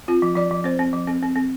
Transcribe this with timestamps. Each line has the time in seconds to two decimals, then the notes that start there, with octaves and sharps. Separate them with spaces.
0.08 C4 F4
0.22 F3
0.36 F3 D5
0.51 F3
0.64 C4 C5
0.79 C4
0.93 F3
1.07 C4
1.22 C4
1.36 C4